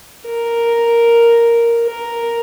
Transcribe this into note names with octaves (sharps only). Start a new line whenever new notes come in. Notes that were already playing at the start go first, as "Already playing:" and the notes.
A#4
A#4